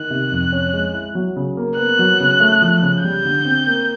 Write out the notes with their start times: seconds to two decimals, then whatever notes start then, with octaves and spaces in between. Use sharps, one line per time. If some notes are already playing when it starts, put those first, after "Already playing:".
Already playing: D#3 F#6
0.10 C3
0.31 F2
0.52 C#4
0.73 G#3
0.94 E4
1.15 F#3
1.36 C#3
1.57 A#3
1.77 B3 F#6
1.99 F#3
2.20 C#3
2.40 A3
2.62 F3
2.82 C#3
3.04 G3 G6
3.25 D3
3.45 C4
3.67 A#3